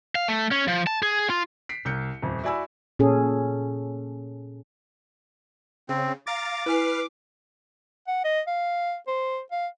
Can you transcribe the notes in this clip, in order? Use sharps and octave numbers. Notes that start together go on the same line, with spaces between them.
F5
A3
C#4
F3
A5
G#4
F4
B6 C7 D7
C2 G6 C#7
D#1 F2
E4 F#4 D5 G#5 B5 E6
A#2 C#4 G#4 A4
C#3 C4
F5 A#5 D6 A6
E4 B4 G#5 F6 C7
F#5
D#5
F5
C5
F5